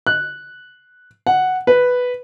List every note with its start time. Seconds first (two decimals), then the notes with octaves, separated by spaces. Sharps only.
0.07 F#6
1.27 F#5
1.67 B4